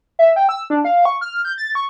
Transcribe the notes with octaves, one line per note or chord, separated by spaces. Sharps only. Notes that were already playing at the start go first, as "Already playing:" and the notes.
E5
G5
E6
D4
F5
C#6
F6
G6
A6
C#6